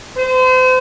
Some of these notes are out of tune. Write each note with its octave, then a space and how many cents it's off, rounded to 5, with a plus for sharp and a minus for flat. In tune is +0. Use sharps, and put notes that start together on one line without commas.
C5 -35